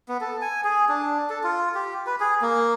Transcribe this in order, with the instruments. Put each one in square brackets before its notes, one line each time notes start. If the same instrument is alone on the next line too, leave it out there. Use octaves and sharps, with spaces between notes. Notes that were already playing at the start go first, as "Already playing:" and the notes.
[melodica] B3
A4
G#5
G#4
D4
A4
F4
G4
B4
G#4
A#3